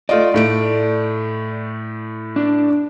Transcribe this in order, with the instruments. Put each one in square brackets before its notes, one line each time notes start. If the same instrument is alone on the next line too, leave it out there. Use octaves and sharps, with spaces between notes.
[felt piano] A3 F4 D#5 [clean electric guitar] D5
[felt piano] A2 A3 D7
[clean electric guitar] D4